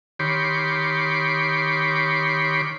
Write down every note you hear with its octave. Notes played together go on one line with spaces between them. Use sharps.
D#3 G4 C#5 B5 C6 D6